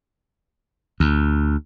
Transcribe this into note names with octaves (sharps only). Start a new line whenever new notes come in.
D2